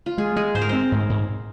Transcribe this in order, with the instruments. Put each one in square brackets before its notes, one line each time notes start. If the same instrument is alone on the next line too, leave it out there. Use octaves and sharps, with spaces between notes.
[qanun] F4
[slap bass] G#3 [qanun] G#4
[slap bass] G#3 [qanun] G#4
[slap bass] G#2 [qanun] C5
[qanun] A#4
[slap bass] C4 [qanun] C5
[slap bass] G#2
G#2